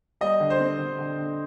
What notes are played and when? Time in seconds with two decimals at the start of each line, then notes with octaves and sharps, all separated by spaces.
0.21 G3 D#5
0.40 D3
0.50 C5
0.60 C4
0.79 D3
0.99 D3
1.18 D3